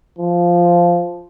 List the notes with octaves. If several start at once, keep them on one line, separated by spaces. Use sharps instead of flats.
F3